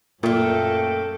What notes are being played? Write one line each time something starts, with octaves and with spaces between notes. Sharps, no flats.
F#2 A#2 A3 A#3 A4 G5